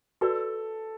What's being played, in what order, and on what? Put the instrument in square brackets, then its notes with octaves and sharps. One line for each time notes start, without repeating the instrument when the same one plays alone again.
[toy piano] F#4 B4 D5 [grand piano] A4